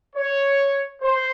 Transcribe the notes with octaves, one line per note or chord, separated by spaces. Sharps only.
C#5
C5